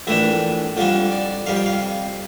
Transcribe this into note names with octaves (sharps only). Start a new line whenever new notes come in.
A#1 A2 E3 A3 D4 E4
F2 D3 G3 D4 F4
D5
F2 C3 G3 F5
G5
F5